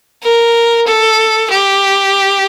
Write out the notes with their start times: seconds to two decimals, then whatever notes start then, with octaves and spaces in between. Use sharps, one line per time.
0.23 A#4
0.87 A4
1.50 G4